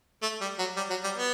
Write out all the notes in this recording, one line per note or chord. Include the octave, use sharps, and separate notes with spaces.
A3
G3
F#3
G3
F#3
G3
B3